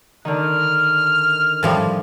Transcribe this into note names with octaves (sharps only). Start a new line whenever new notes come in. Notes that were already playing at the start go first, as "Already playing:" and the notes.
D3 D#3 F6
A2 F3 G3